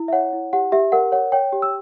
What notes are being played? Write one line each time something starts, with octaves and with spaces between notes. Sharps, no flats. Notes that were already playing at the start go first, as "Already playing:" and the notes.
Already playing: E4
E5
C#5 F#5
E4
G4 F#5
G4 E5
A#4 F#5
C#5 F#5
C#5 G5
G4
E6